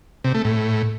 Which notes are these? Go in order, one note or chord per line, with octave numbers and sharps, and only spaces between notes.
C3
A3
A2